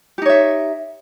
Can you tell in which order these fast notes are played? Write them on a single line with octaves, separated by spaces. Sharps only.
G4 D#4 C#5 E5